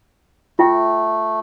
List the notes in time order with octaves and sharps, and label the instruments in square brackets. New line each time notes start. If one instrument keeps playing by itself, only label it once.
[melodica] A3 [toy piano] F4 E5 G5